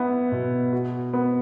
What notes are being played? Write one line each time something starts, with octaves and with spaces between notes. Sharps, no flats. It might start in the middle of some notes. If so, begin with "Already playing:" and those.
Already playing: B3 E4
B2
F#4
B3